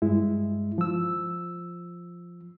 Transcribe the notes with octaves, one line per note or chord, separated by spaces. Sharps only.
G2 G#3 E4
F3 E6